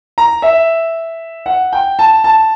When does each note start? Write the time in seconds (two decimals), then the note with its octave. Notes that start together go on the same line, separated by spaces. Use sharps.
0.18 A#5
0.42 E5
1.46 F#5
1.73 G5
1.99 A5
2.24 A5